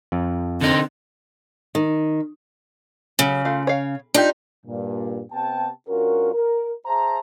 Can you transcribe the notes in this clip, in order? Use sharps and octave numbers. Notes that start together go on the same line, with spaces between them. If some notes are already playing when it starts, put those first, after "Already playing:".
F2
D3 C4 D#4
D#3
C#3 F#3 C#4
A3 F4 F5
C#5 F5
D4 D#4 F4 G4
G2 A#2
C3 B3 G4 G5 A5
G2 C#4 F4 F#4 A#4
A#4
G#4 C5 E5 A5 A#5